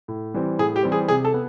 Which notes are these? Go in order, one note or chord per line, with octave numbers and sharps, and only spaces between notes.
A2
E3 G3 C4
A2 G#4
G4
E3 G3 C4
G#4
C3 G#4
A4
B3